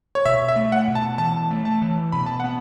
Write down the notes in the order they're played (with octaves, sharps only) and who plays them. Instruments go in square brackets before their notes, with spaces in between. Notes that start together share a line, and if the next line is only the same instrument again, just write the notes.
[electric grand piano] C#5
[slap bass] B2 [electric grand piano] E5
[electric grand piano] E5
[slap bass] A3
[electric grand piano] F#5
[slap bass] B2
[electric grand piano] A5
[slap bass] E3 [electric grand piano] A5
[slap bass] A3
[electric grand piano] A5
[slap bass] E3
[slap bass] B2 [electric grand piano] B5
[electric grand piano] A5
[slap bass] B3 [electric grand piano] F#5